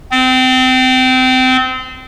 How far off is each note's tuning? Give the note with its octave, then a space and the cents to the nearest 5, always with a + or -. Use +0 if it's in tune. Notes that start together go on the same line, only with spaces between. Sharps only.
C4 -25